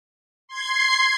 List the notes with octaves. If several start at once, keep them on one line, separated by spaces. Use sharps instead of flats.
C6 G#6 C7